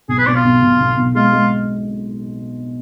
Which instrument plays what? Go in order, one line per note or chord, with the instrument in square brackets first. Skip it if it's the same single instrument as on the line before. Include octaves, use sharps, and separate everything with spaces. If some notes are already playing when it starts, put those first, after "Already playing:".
[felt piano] B1 [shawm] G#4
[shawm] B4
[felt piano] B2 [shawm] D5
[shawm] F4
[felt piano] B1
B1
B1
B1
[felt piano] G#3 [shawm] F4
[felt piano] G#3